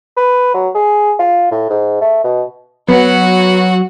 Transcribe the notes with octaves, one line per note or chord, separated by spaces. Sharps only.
B4
F#3
G#4
F4
A2
G#2
A3
B2
F#3 B3 F#4 F#5